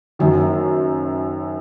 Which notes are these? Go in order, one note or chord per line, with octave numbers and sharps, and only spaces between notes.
F#1 F#2 D#3 F#3